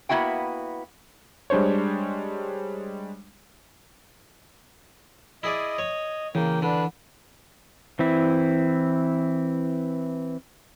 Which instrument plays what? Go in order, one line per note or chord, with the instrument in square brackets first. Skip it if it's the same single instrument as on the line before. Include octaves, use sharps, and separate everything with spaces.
[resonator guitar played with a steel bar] A#3 B3 E4 F#4 G5
[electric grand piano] G3 G#3 D4 C5 C#5
[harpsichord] E4 G#4 D5 [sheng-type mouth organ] D#5
[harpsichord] C#5
[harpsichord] C#3 [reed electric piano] E3 [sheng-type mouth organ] A#3 G5
[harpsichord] D3 [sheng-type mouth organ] D4 B4
[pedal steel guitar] E3 C4 E4